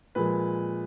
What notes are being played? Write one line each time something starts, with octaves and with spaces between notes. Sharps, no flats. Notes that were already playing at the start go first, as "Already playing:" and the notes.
A#2 F3 G#3 B4